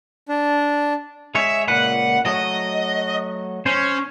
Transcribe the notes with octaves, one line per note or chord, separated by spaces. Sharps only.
D4
G#3 C#5 E5
C#2 A#2 B4 F#5
F#3 A3 F#4 D#5
C#4 C5